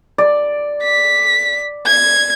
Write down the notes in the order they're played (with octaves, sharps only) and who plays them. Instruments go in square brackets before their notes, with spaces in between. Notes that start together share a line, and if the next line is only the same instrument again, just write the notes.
[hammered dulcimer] D5
[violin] B6
G#6